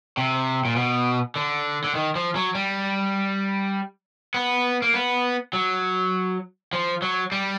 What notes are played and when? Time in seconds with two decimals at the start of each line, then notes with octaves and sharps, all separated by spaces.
0.17 C3
0.65 A#2
0.76 B2
1.36 D3
1.84 D3
1.95 D#3
2.15 F3
2.36 F#3
2.55 G3
4.34 B3
4.82 A#3
4.94 B3
5.53 F#3
6.73 F3
7.02 F#3
7.32 G3